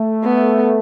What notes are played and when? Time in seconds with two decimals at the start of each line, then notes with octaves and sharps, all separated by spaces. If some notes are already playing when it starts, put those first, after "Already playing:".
Already playing: A3
0.24 B3